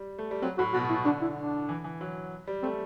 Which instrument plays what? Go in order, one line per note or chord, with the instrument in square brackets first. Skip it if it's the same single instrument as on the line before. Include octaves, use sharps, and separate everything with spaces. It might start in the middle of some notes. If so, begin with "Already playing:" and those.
Already playing: [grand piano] G3
A3
G3
[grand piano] F#3 [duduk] C4
[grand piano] A2 [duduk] F#4
[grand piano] B2 [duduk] F#4
[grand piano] B2
[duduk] E4
[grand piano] B2
[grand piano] D3 [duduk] D4
[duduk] E4
D4
[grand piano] E3
E3
F#3
G3
[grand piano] A3 [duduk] C4